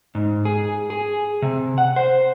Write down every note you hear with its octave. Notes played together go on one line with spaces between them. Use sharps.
G#2
G#4
G#4
C3
F#5
C5